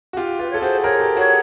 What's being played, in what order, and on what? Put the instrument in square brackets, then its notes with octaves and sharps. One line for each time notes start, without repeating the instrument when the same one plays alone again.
[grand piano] F#4
F4 G4
[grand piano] F4 G4 [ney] B4
[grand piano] A4 [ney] C#5
[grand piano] F#4 G#4 [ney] C5
[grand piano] G#4 A#4 [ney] C#5
[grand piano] G4 A4
[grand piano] F#4 G#4 [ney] C#5